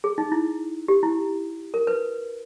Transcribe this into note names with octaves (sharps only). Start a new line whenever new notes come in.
G#4
D#4
E4
G4
E4
A#4
B4